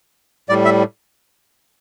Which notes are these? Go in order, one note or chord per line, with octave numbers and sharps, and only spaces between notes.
A2 G3 D5
E5